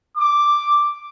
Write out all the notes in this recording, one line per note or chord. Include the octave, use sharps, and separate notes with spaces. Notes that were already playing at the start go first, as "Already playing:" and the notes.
D6